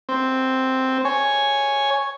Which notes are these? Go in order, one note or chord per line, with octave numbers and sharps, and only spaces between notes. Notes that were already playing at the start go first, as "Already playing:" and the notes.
C4
C#5 G#5